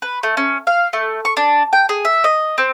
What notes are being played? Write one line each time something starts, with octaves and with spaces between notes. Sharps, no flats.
B4
A3
C#4
F5
A3
C#6
D4
G5
G#4
E5
D#5
C4